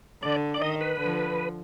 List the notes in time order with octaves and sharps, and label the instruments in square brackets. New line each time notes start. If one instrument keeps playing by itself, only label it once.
[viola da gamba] D3 [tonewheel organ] D5
[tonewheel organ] D5
[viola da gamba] D#3 [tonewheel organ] D#5
[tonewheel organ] B4
[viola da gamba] D3 F3